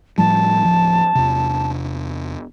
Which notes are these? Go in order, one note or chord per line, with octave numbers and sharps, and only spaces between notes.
A2 F3 G3 A5
D1 F3
E2 C3